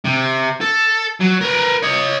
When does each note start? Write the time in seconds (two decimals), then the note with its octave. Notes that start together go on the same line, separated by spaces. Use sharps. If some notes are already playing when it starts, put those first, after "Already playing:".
0.05 C3
0.61 A4
1.20 F#3
1.41 A#4 B4
1.83 C#5 D#5